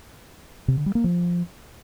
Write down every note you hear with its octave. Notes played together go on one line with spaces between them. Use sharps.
C3
D3
G3
A#3
F3